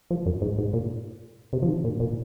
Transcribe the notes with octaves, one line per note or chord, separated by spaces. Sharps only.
F3
F#2
G#2
G#2
A#2
C3
F3
D#3
A#2
A#2